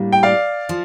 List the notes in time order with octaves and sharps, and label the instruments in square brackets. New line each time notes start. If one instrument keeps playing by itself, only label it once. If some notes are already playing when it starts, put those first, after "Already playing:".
Already playing: [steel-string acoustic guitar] A2 G3 A#3 D4
[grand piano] G5
D5 F5
[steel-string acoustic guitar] F3